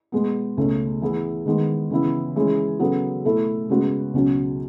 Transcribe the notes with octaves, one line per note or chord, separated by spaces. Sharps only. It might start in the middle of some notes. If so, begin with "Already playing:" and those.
B2 G#3 B3
C#2 B2 A3 C#4
E3 B3 E4 G#4
D#3 G#3 B3
C#3 E3 B3 E4
E3 G#3 C#4 G#4
C#3 F#3 B3 F#4 A4
B2 A3 E4 A4
C#3 G#3 B3 F#4
C#2 B2 F#3 C#4